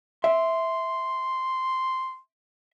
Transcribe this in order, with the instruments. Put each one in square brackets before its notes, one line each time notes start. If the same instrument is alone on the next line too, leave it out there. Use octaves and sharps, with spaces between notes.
[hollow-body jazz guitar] E5 [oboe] C6